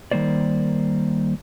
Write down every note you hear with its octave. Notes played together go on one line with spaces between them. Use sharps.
D#3 G3 A#3 C5 D5